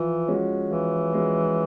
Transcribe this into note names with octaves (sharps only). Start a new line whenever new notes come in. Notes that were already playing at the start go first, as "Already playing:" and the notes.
Already playing: E3 F3
G#3 C#4 F#4
E3 F3
G#3 C#4 F#4